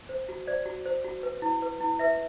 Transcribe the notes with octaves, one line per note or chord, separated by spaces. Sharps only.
C5
F#4
C5 D5
F#4
C5
F#4
B4
E4
B4
E4
B4 E5